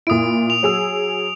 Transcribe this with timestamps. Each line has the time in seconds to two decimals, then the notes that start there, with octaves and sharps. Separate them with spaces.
0.07 A#2 E4 D#6 D7
0.50 F7
0.63 F#3 G#4 E6